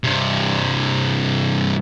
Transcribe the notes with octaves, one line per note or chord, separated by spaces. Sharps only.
G2 C3